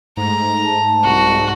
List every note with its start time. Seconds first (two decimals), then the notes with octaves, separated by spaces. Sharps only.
0.17 G#2 A3 A#5
0.65 A5
1.03 C2 F#4